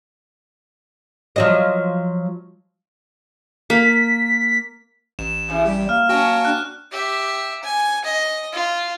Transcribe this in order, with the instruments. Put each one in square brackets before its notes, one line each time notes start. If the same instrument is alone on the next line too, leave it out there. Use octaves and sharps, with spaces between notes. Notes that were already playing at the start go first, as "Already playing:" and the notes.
[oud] F3 F#3 D#5
[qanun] A#3 [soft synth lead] B6
[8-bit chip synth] A1 [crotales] E7
[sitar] C#3 E3
[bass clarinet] G3 [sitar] G4
[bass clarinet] A#3 [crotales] F6
[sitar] F#3 C#4 [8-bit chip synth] F#4 G5 A5
[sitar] D4 [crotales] F#6
[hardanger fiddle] G4 E5
G#5
D#5
F4